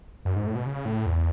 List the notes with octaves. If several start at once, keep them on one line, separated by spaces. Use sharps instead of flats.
F#2
G#2
A2
B2
C#3
A2
E2